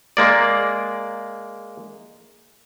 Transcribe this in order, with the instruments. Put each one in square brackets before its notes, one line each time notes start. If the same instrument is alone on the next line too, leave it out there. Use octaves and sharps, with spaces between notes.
[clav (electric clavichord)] G#3 A#3 D5